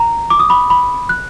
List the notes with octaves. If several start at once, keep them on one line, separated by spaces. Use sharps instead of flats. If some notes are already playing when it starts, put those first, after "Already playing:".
Already playing: A#5
D6
D#6
B5
B5
F#6